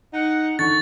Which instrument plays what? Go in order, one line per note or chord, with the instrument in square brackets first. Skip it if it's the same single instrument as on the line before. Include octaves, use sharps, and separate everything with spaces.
[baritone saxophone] D#4 [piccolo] F#5
[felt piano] D3 D#3 [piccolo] C#6 [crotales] A6